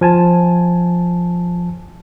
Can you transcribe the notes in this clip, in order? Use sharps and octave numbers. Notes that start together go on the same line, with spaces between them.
F3 G#5 A5